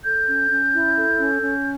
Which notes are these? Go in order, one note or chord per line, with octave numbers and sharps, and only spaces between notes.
A4 G6
C#4
C#4
E4
A4
C#4
C#4